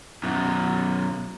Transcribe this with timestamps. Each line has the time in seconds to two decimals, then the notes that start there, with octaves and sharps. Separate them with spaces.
0.23 F#2 B2